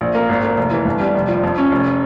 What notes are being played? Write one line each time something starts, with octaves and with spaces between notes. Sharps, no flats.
A#1
A#3
G#1
A#3
F1
E3
G1
G3
F1
F3
F2
C#4
F1